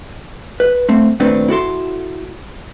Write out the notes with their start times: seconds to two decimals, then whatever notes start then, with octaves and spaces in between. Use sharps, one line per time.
0.60 B4
0.89 A3 C4
1.20 D#2 A#2 A3 C4 D4 B4
1.48 E4 F#4 A4 C6